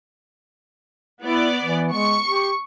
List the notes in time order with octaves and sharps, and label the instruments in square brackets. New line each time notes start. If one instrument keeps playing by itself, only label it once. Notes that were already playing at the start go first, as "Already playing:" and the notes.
[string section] B3 D5 [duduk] E4
[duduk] E3
[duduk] G#3 [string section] C#6
[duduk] G4